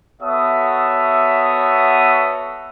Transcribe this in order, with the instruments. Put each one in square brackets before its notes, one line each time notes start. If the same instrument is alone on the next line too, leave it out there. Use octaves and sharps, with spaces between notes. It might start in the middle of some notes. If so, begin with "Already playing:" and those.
[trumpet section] B3 F#4 A4 C#5 E5 D#6